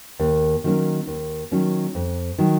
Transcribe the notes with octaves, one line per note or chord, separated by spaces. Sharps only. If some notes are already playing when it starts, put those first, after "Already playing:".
D#2
D#3 F#3 A#3 C#4
D#2
D#3 F#3 A#3 C#4
F2
D#3 F#3